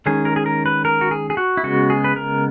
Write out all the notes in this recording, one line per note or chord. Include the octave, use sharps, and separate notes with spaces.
D#3 G#3 C#4 G#4
A#4
G#4
A#4
B4
A#4
F#4
G#4
G#4
F#4
E4
C#3 G#3 B3 F#4
G#4
B4
A#4